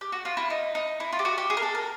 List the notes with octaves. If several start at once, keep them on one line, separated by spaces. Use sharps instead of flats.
G4
F#4
F4
E4
D#4
D#4
E4
F4
G4
F#4
G4
G#4
A#4
A4
A#4